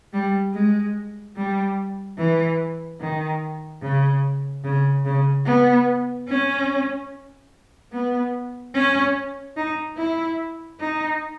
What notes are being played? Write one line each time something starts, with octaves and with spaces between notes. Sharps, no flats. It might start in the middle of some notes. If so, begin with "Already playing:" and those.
G3
G#3
G3
E3
D#3
C#3
C#3
C#3
B3
C#4
B3
C#4
D#4
E4
D#4